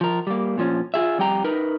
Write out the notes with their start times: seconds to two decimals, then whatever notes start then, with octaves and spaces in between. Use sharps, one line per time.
0.01 F3 A#4
0.27 G3 A#3
0.57 A#2 F3 C#4
0.94 F4 G#4 E5
1.18 F2 G3 G4 G5 A#5
1.44 D#4 A#4 B4